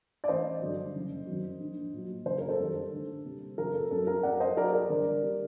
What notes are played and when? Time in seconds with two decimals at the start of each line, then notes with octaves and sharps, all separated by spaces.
0.24 D5
0.28 A1 C5 D#5
0.62 G2 D3 F#3
0.95 F#1
1.27 F#2 D#3 F#3
1.60 A#1
1.93 A#2 F#3
2.26 F#1 C5
2.38 A#4
2.49 A4 C5
2.59 F#2 D#3 G3
2.92 D2
3.25 C3 G3
3.58 F#1 A#4
3.74 A4
3.91 F#2 F#3 A4
4.07 A#4
4.23 F#2 D5 F#5
4.40 C5 D#5
4.56 F#3 A#4 D5
4.73 A#4 D5
4.89 G1
5.23 D3 G3